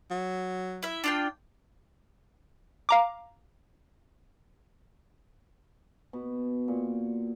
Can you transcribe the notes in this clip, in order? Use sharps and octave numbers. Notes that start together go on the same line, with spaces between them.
F#3
E4 E5
D4 F4 G5
F5 A#5 D6
B2
A#2